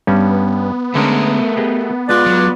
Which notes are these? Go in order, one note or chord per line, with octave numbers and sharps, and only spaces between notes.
G2 G3 B3 C#4
D3 G#3 A3 C#4 A#4
G4 G#4 D#5
G#3 F4 B4 D5
F#3